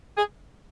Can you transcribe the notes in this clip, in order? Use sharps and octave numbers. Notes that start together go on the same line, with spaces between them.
G#4